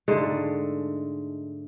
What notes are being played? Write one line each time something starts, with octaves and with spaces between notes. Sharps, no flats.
G#2 D3 G#3 A3